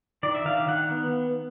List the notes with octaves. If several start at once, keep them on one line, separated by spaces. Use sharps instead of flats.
D#3 D5
E5
D#3 F5
F5
D#3 F#5
B3